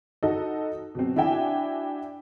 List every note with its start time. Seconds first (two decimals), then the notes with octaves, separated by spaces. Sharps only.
0.23 D#4 F#4 A4 D#5
0.95 B2 F#3 C4
1.16 D4 E4 F#4 E5 G5 G#5